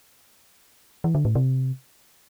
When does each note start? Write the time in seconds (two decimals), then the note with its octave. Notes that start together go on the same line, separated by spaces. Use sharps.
1.04 E3
1.15 D3
1.25 A2
1.35 C3